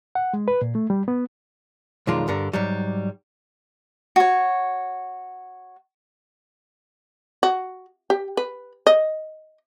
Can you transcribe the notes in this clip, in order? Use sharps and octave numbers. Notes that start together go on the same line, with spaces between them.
F#5
G#3
B4
A#2
A3
G3
B3
B1 F2 D#3 G#3 F4 D5
G2 D3 A#4
G#2 F#3 G3
F#4 C#5
F#4
G4
B4
D#5